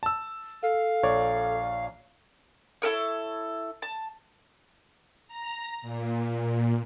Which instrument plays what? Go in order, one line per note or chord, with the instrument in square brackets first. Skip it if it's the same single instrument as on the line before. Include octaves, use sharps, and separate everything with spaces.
[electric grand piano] A5 E6
[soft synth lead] A4 [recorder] F5
[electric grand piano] A#1 C#5 D5
[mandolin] E4 A4 A#4 C#5
A5
[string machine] A#5
A#2